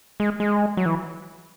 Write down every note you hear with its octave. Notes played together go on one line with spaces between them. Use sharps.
G#3
G#3
F#3
E3